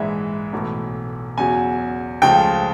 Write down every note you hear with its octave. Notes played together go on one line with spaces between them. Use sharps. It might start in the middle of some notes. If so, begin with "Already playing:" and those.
Already playing: A#1 G#2 E3 G#3 E5
B1 A2 E3 A3
E2 C#3 F#3 G#5
C#2 C#3 F3 A3 G5